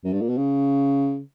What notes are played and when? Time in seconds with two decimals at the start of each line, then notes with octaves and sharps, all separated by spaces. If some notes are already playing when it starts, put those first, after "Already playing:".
0.04 F#2
0.13 G2
0.21 A#2
0.29 B2
0.37 C#3